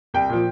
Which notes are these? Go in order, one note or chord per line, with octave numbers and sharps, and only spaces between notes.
C2 G5
A#2 F3